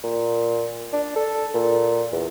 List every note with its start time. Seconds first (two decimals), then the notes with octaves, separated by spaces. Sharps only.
0.04 A#2
0.93 D4
1.16 A4
1.54 A#2
2.12 E2